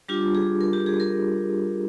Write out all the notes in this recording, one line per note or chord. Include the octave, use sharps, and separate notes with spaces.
G3 D4 F4 G4
G#4
A#4
G4
G#4
A#4